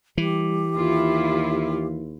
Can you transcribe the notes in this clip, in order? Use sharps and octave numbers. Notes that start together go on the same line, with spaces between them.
E3 G3 G4
D#2 E4 F4